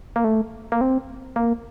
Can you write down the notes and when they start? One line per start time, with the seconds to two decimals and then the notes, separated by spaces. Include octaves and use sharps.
0.16 A#3
0.24 A3
0.72 A#3
0.81 C4
1.36 A#3